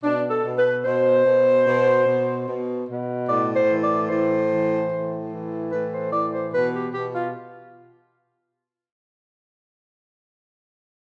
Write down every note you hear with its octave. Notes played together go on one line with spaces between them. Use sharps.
B2 D4
A4
B2
B4
B2 C5
B2
B2
B2
B2
B2
A2 D5
C5
E3
D5
A2 C5
E3
A2
E3
A2 B4
C5
E3 D5
C5
B2 B4
G4
B2 G4
F4